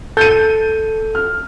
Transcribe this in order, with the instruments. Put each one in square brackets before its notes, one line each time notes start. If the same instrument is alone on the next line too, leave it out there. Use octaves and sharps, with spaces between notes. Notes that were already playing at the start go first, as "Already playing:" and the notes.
[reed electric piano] A4 [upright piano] G6 D#7
[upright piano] F6